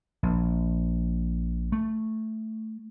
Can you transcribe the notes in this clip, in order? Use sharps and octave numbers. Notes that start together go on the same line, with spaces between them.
A#1
A3